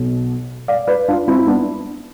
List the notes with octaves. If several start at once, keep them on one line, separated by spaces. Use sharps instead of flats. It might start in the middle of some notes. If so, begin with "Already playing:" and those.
Already playing: B1 B2
D5 F5
B4 D5
D4 F4
C4 E4
E4
B3 D4